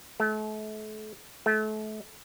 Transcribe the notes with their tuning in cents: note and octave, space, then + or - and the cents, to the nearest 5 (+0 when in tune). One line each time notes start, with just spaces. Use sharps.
A3 -40
A3 -35